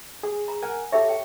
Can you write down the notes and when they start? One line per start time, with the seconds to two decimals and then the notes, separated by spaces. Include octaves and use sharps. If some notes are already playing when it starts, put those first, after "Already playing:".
0.23 G#4
0.48 A#5
0.62 A#4 F#5 G#5
0.92 G4 A4 C#5 E5
1.09 G5